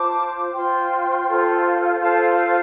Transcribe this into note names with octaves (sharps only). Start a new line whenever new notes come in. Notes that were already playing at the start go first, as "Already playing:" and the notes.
Already playing: F4 C5 A5 D6
F4 C5 G5 C6
F4 A4 C5
F4 A4 C5 F5 A5
F5